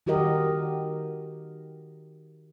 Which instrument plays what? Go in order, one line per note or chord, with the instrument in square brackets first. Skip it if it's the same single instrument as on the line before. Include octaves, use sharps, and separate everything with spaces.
[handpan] D#3 F#4 G4 A#4 D#5